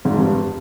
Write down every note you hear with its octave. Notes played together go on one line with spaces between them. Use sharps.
G#1 G#2
F2
G2